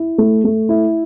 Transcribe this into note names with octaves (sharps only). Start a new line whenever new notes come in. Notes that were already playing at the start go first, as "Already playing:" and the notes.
Already playing: E4
A3
A3
E4